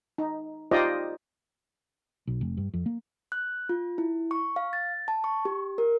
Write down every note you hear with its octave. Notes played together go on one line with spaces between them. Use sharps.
D#4
D#4 F4 G4 C5 D5 D#5
B1
F1
G2
F2
A#3
F#6
F4
E4
C#6
F5
A6
A5
C#6
G4
A#4